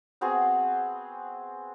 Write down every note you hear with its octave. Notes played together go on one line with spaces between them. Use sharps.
B3 C4 F#4 G#4